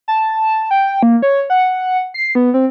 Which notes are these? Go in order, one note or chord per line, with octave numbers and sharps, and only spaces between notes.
A5
G5
A#3
C#5
F#5
C7
B3
C4